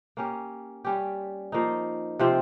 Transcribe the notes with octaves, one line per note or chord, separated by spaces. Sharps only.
A#3 C#4 G4
G3 C#4 G4
F3 A#3 D#4
C3 F3 C4 G4